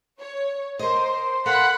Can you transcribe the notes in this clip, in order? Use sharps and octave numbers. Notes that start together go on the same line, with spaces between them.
C#5
A#4 C5 D#5 C6
A4 A#4 F5 F#5 B5 F#6